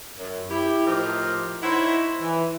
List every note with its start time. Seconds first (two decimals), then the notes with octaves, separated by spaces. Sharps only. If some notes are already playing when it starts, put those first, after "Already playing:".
0.16 F#2
0.50 E4 G4
0.87 A2 F3 D#4 G4 A#4 C5
1.63 D#4 E4 C5 C#5 E5 F#5
2.22 E3